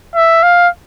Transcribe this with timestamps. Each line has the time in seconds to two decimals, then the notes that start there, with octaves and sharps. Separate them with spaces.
0.16 E5
0.43 F5